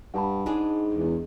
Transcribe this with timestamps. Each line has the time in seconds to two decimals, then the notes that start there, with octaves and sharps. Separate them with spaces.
0.14 G2 F#5 A5 B5
0.46 G#2 G#3 D4 G#4
0.94 E2